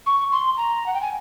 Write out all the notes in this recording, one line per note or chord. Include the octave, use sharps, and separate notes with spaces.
C#6
C6
A#5
F#5
G5
G#5